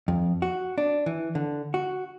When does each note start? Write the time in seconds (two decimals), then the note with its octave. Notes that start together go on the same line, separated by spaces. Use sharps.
0.08 F2
0.42 F#4
0.78 D4
1.06 E3
1.35 D3
1.74 F#4